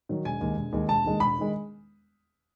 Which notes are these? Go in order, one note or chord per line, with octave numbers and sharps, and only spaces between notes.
D#3 F#3
E1 G#5
D#2 D#3 G#3
E1
D#2 D#3 G#3
E1 A5
D#2 D#3 G#3
E1 B5
D#3 G#3